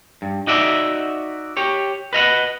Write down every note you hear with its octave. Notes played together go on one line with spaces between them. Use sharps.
G2
D#4 F#4 D5 E5
G4 C#5
B4 D#5 F5 F#5